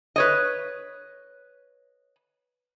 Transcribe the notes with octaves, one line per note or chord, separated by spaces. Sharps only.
B4 C#5 D#5